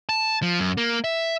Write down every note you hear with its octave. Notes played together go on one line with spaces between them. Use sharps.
A5
F3
F#2
A#3
E5